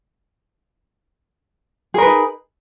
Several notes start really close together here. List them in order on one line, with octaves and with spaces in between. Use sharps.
G#4 A#4 B4 D#4